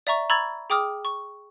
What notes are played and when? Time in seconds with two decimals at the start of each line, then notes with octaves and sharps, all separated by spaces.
0.07 D5 E5 A#5 C#6
0.30 A#5 B5 C#6 E6 G#6 A6
0.70 G#4 G5 D6 D#6 F6
1.05 C#6